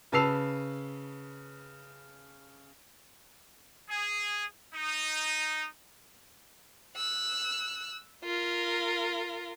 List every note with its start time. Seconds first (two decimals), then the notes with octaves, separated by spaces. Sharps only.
0.12 C#3 B4 A5 E6 C7 F7
3.90 G#4
4.74 D#4
6.96 E6 F#6
8.24 F4 A#4